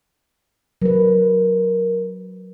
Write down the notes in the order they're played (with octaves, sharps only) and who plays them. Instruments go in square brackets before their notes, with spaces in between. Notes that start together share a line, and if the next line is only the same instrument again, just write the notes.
[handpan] F#3 B4 [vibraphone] A#4